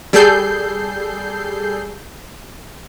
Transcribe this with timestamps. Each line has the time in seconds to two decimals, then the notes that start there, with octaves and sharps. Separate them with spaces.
0.13 G3 G#4 A4 G6 C7